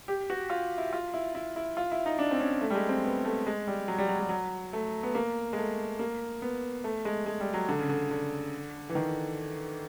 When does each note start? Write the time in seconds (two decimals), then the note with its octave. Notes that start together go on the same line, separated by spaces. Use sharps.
0.08 G4
0.30 F#4
0.50 F4
0.78 E4
0.93 F4
1.14 E4
1.35 E4
1.56 E4
1.77 F4
1.92 E4
2.06 D#4
2.19 D4
2.31 C4
2.40 C#4
2.61 A3
2.70 G3
2.75 G#3
2.89 C4
3.04 B3
3.25 A3
3.47 G#3
3.67 G3
3.88 F#3
3.98 G3
4.09 F#3
4.19 G3
4.29 F#3
4.73 A3
5.03 B3
5.15 A#3
5.53 G#3
5.58 A3
5.99 A#3
6.42 B3
6.84 A3
7.05 G#3
7.26 G#3
7.40 G3
7.54 F#3
7.68 D3
7.79 C#3
7.89 D3
8.11 D3
8.89 E3
8.95 D#3